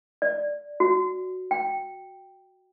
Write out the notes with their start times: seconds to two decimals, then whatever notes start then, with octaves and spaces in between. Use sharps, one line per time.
0.22 D5
0.80 F#4
1.51 G5